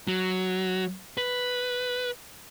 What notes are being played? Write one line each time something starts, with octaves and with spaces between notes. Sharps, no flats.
F#3
B4